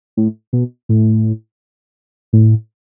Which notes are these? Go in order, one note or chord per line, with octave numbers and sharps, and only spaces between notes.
A2
B2
A2
A2